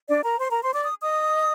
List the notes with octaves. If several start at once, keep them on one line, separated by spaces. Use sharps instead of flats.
D4 D5
A#4 A#5
C5 C6
A#4 A#5
C5 C6
D5 D6
D#6
D#5 D#6